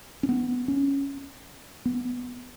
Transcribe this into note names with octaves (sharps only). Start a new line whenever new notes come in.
C#4
B3
C#4
B3